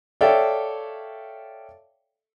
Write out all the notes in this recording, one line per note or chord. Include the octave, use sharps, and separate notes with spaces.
A4 C#5 D5 E5 F5 G5